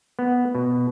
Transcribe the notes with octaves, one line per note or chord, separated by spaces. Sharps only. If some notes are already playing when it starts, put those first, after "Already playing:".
B3
B2